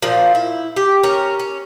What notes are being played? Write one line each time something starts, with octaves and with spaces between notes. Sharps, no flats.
A#2 F3 C5
E4
G4
C#4 A#4
C#4